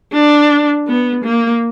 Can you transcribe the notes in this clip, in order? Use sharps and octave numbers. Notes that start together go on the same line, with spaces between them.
D4
B3
A#3